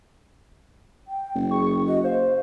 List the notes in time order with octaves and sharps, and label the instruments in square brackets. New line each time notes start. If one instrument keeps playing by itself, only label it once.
[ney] G5
[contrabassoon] F#1
[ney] G#4 [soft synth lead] C#6
[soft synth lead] F#4 [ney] D#5
[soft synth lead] C5 [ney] F5